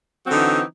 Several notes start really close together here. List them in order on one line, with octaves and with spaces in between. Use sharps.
C4 F#3 D3 D#4 E3